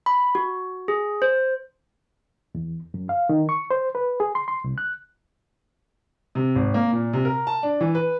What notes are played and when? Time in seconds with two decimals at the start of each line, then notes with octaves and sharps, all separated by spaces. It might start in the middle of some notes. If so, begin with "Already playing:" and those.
0.06 B5
0.35 F#4
0.88 G#4
1.22 C5
2.55 E2
2.94 F#2
3.09 F5
3.29 D#3
3.49 C#6
3.71 C5
3.95 B4
4.20 G#4
4.35 C6
4.48 C6
4.64 C2
4.78 F#6
6.35 C3
6.55 G#1
6.74 A#3
6.93 A#2
7.13 C3
7.25 A#4
7.47 A5
7.63 D4
7.81 E3
7.95 B4